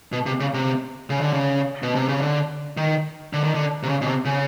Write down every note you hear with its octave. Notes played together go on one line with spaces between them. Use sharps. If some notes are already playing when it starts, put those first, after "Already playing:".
B2
C3
C#3
C3
C#3
D3
C#3
B2
C3
C#3
D3
D#3
D3
D#3
D3
C3
C#3
B2
C3
C#3